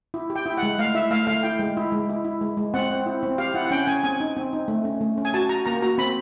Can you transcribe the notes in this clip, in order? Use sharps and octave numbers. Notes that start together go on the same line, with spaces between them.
E4
G4
G5
E4
F#5
G#3
A3 F5
E4 E5
A3 F5
A3 F5
E4 G5
G#3
E4
G#3
E4
E4
G#3
G#3
C4 F#5
C4
E4
C4
G4 F5
E4 F#5
F#5
C#4 G5
C#4 G#5
C4 G#5
D#4
C4
D#4
A3
C#4
A3
C#4
G#5
F#4 A5
F#4 A#5
A#3 A#5
F#4 A#5
C4 B5